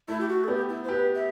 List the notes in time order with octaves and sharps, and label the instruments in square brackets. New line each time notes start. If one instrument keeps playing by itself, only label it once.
[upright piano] A3 [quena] E4
[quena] G4
F#4
A4
[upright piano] B3 [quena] G4
[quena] E4
C5
[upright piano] G4 [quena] B4
[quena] E5